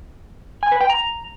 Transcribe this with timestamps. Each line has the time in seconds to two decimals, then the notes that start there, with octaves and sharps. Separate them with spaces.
0.63 G#5
0.72 B4
0.81 G5
0.90 A#5